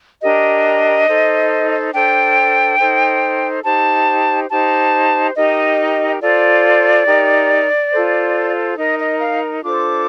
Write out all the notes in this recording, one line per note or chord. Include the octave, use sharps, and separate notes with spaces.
D4 G4 A#4 D#5
D#4 A4 C5
D4 A4 C5 G5
D#4 A4 C5
D#4 G4 C5 A5
D#4 G4 C5 A5
D#4 G4 A#4 D#5
F4 A4 C5 D5
D#4 G4 A#4
F4 A4 C5
D#4 A#4 D#5
D#5
F5
D4 F4 A4 C5 D6